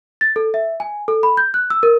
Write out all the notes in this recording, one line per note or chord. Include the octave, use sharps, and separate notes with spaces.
A6
A4
E5
G#5
A4
B5
G6
F#6
E6
A#4